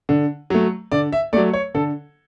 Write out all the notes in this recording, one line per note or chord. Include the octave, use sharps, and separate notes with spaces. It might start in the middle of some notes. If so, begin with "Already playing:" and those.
D3
F#3 A3
D3 D5
E5
F#3 A3 D5
C#5
D3 A4